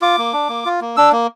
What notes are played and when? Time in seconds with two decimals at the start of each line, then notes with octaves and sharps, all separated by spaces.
0.01 F4 D6
0.18 A#3
0.33 D4
0.49 A#3
0.65 F4
0.81 A#3
0.97 D4 E6
1.12 A#3